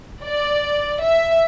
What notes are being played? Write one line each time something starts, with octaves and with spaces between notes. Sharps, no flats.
D5
E5